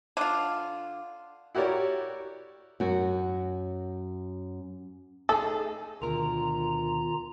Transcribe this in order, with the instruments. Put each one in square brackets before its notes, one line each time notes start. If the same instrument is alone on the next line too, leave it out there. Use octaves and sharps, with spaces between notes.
[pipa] D3 F4
[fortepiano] E4 F#4 G4 A#4 C#5 D5
[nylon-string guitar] F#2 F#4
[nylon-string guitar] A3 D#4 G#4 [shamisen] A4
[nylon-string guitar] D2 B2 A#4 [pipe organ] D#3 F4 A#5